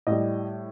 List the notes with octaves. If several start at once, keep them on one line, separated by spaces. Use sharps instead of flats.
A2 G3 D#5